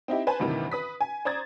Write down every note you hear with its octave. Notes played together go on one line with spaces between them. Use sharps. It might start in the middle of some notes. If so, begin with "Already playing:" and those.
C4 D#4 E4 G4
B4 C5 G#5 A5
D2 G2 C3 D#3 E3
B4 D#6 B6
G#5
C5 D5 A#5 D#6 G#6 A6